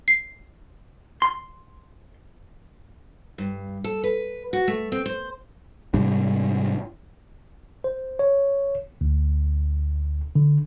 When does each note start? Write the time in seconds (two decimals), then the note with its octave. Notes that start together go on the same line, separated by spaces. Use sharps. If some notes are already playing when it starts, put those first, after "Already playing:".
0.08 C7
1.22 C6
3.38 G2
3.84 A4
4.04 B4
4.53 F#4
4.68 A3
4.92 C4
5.06 C5
5.94 G#2 C3 G3 D4
7.84 C5
8.19 C#5
9.01 D2
10.35 D3